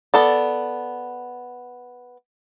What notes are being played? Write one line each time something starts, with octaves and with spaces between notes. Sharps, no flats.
B3 A4 D5